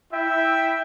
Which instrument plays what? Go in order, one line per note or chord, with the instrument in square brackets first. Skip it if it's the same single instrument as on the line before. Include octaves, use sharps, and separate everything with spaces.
[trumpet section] E4 E5 G5